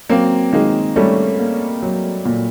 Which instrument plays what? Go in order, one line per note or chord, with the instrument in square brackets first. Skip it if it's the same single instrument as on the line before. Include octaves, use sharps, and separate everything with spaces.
[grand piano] F#3 [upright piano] A#3 C4
[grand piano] D#3 [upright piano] G#3 A#3
[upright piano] G3 A3 [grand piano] C#4
[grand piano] A#3
F#3
A#2